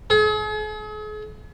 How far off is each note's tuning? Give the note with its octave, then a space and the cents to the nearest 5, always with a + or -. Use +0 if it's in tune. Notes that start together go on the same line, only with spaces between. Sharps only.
G#4 +45